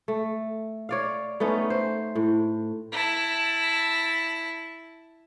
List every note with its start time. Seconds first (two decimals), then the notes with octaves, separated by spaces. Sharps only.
0.08 A3
0.89 C#5 D5 F5
1.40 A3 B3 C#4 D#4
1.70 C5
2.15 A2
2.92 E4 A5